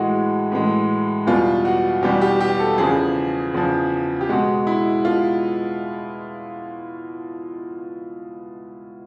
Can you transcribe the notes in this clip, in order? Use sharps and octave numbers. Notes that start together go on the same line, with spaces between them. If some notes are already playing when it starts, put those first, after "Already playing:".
Already playing: A2 E3 G#3 F#4
A2 E3 G#3
E2 B2 G3 F4
F#4
E2 B2 G3 G4
G4
G4
A4
E2 C#3 F3 G#4
E2 C#3 F3
G4
B2 G#3 F#4
E4
B2 F4